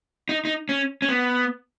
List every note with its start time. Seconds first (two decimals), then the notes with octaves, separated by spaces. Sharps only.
0.29 D#4
0.45 D#4
0.69 C#4
1.02 C#4
1.09 B3